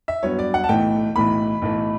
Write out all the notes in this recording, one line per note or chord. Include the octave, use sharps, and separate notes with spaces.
E5
G2 F#3 B3 C#5
D5
F#5
A5
B1 A2 E3 A3 G5
B1 A2 E3 A3 B5
B1 A2 E3 A3